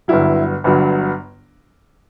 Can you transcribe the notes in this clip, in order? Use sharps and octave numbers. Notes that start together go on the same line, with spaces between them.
G1 G2 F#3 E4
G1 G2 F#3